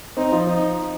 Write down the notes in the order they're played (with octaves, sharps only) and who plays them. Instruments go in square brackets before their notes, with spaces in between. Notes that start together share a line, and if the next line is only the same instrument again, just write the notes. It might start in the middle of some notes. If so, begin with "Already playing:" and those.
[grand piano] C4 [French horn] D#4
[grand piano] F3
[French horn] D#4